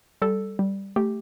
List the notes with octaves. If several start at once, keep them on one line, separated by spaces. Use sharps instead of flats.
G3 A4
G3
A3 G4